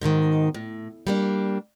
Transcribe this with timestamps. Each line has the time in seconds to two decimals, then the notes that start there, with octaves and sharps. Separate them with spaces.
0.01 G#2 B2 D3 D#3
0.54 A2
1.07 G3 A#3 D4